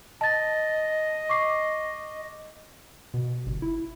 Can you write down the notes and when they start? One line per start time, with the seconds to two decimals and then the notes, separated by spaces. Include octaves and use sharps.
0.21 D#5 A5 A6
1.29 C#6 D6 C7
3.14 B2
3.46 G1
3.62 E4